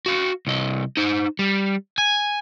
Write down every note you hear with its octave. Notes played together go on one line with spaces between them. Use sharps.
F#4 F5
C2 D#5
D#4 C5
G3
G#5